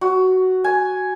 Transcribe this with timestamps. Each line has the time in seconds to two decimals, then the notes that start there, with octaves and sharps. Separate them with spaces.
0.01 F#4
0.64 G#5